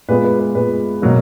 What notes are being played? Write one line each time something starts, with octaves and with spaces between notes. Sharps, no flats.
A#2 G#3 B3 B4
B4
B4
A#2 G#3 B3 B4
B2 F#3 A#3